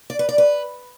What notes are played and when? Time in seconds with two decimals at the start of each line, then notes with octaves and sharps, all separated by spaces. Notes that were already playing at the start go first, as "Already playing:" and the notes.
0.10 D5
0.19 B4
0.29 D5
0.38 B4